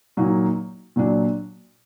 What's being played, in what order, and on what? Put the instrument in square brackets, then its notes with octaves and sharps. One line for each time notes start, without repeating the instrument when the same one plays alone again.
[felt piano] A#2 F#3 A#3 D#4
A#2 F#3 D4